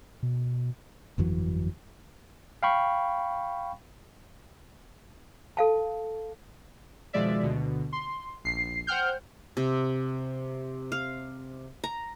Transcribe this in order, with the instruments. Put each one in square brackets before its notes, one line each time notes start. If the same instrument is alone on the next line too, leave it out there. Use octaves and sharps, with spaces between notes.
[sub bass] B2
[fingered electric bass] G1 F2 E3 F#3
[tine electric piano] F5 G5 B5 C#6
[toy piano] A4 F5 A5
[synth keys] B2 D#3 F3 G#3 D5 E5
D2 B2 D3
C6
A#1 C7
C5 F#5 G5 F6 G6
[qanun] C3
F5
A#5